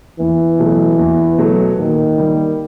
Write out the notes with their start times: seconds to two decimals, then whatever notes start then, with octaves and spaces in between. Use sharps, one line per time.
0.19 E2 E3
0.58 B2 F#3 A3
0.99 E2
1.38 B2 F#3 A3
1.78 A#2 D#3
2.18 G3 A#3